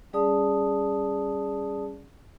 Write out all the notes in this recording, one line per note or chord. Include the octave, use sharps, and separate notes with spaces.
G3 C#4 G#4 D5 A5 D#6